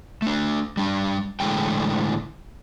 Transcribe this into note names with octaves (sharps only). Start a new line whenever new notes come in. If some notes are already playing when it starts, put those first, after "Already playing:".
A3 D4
G3 D4
A2 D3 E3 G#3 G5